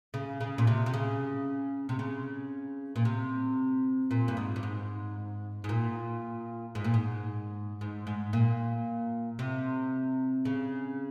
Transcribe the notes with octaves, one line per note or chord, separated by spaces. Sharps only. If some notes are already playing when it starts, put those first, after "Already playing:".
C#3
C#3
A#2
C3
C3
C#3
C3
C#3
A#2
C3
A#2
G2
G#2
G2
G#2
G#2
A#2
G#2
A#2
G#2
G#2
G#2
A#2
C3
C#3